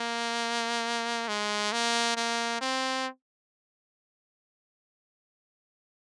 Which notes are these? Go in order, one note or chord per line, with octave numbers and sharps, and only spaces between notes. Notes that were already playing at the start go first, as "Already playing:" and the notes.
Already playing: A#3
G#3
A#3
A#3
C4